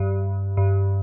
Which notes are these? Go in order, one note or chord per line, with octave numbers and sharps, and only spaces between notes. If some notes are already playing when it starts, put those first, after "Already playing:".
Already playing: G2
G2